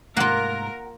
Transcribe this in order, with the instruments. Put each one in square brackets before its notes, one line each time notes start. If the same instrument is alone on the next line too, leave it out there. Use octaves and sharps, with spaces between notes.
[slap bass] G#2 C3 A3 [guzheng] A#3 F4 [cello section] A#4 [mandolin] F#5 F#6